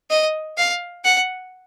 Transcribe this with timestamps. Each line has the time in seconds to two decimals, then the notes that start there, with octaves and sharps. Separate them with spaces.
0.10 D#5
0.57 F5
1.04 F#5